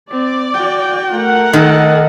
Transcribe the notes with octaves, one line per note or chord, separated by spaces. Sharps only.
C4 D5
F#4 G5
A3 A#4 F#5
D#3 A4 D#5